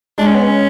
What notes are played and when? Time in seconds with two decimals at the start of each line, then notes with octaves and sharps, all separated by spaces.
0.18 G#3 D4
0.27 C#4
0.35 B3
0.44 C#4